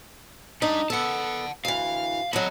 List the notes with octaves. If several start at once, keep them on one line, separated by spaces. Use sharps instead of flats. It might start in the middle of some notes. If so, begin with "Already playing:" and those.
G3 D4 D#4
B3 A4 F#5 A5
D2 E3 F5
F#3 A3 D#5 B5